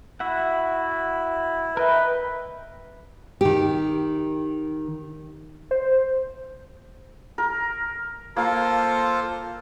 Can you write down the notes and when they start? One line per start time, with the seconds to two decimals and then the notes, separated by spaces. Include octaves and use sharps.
0.20 E4 F#4 E5 F#5
1.77 A#4 B4 D#5 E5 G5
3.41 D#3 G4
5.71 C5
7.38 A#4
8.37 A#3 F4 A4 C5